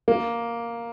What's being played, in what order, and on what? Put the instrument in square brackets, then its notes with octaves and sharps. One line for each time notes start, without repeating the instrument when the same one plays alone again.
[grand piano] A#3